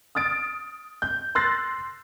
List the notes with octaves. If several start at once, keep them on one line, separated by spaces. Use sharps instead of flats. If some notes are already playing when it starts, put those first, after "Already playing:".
D#6 F6 A6 D7
G6
C6 E6 F#6 A6 A#6 C7